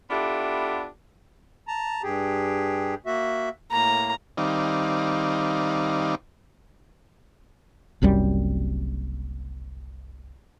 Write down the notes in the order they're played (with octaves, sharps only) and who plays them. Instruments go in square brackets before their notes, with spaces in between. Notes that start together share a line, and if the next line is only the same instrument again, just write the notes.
[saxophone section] B3 D4 E4 F4 G4 A4
[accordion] A5 A#5
G2 G4 G#4
A#3 F#4 E5
[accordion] A2 A#3 [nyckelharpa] A#5
[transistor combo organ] D#3 G3 C4 D#4 D5 F5
[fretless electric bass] F#1 C2 F#2 G3